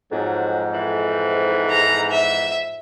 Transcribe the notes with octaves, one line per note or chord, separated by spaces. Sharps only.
F2 G#2 F#3
E3
A#5
E5